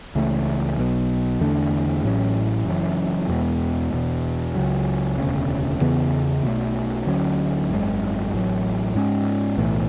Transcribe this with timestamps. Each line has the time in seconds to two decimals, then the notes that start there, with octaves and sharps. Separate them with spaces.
0.15 C#2 C#3 E3 A3
0.78 B1 B2 F#3
1.41 E2 D3 A3 D4
2.04 A1 A2 F#3 C#4
2.66 F#1 F#2 E3
3.29 E2 B2 G#3 B3
3.92 E1 E2 B2
4.55 C#2 C#3 F#3
5.18 E1 D2 C#3
5.81 E2 C#3 E3 B3
6.44 B1 B2 A3
7.06 D2 D3 F#3 C#4
7.69 G#1 F#2 C#3 G#3
8.32 A1 A2 F#3
8.95 G#2 G#3 C#4
9.57 B1 A2 E3 A3